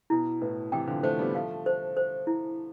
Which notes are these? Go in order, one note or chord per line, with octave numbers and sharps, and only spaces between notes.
B2 E4
A2 B4
C3 E3 G5
D3 F3
F3 A3 C5
G3 B3
F3 A3 F5
C5
C5
E4